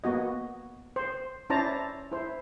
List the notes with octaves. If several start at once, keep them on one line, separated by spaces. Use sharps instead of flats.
A#3 B3 F#4 D#5
C5
C#4 E4 C5 D5 A5 A#5
E4 C5